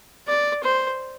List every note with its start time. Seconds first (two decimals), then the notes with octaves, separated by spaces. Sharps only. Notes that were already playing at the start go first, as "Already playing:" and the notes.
0.28 D5
0.64 C5